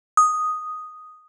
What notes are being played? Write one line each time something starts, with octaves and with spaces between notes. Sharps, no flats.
D#6